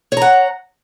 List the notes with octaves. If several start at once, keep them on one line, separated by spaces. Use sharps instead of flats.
C#5 F#5 A#5